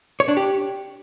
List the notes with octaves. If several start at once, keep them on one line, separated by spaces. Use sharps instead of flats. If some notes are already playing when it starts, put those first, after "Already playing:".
C#5
D4
G4